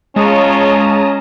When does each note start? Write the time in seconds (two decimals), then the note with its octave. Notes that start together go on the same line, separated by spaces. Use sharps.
0.16 G#3 C#4 F4 C#5 A5 A#5 D#6